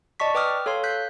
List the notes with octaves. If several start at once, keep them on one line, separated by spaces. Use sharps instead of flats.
D5 D#5 A5 C#6 B6
B4 G5 D6 D#6 F6
A4 C#5 F5 C6
F#6 G6 B6